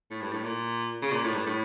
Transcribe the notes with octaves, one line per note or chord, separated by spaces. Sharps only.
A2
G2
A2
A#2
C#3
A#2
A2
G2
A2